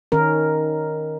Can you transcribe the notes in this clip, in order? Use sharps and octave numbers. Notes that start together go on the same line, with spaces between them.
D#3 C#4 A#4